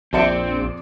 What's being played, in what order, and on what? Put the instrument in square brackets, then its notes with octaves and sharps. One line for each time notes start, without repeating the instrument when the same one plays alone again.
[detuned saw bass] A#1 [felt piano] F2 D5 C#7 [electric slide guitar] C4